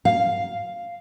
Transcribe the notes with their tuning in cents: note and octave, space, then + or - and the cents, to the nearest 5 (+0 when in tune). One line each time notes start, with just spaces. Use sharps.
F5 -5